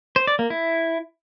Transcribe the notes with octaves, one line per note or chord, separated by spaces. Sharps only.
C5
D5
A#3
E4